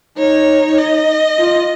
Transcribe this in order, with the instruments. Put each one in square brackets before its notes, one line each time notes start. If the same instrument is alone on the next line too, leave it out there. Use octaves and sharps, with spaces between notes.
[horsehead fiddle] D#4 [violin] C#5
[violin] D#5
[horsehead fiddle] F4